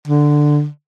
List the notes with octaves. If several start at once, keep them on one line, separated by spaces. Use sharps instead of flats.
D3